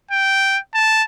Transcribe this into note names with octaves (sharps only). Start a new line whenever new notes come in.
G5
A5